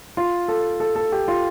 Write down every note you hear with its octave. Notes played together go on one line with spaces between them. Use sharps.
F4
A4
A4
A4
G4
F4